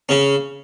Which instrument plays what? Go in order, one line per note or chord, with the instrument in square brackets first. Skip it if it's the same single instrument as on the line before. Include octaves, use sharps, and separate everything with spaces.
[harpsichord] C#3 C#4